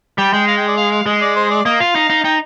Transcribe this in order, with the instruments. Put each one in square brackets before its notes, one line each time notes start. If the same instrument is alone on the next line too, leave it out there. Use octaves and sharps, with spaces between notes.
[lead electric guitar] G3 [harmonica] G5
[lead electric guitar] G#3 [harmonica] G5
[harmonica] F5
G5
D5
F5
F5
[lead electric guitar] G#3 [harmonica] D#5
[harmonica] D5
C5
D5
[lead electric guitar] A#3 [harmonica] D#5
[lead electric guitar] F4 [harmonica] F5
[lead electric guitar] D#4
D#4
[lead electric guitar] D#4 [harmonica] G5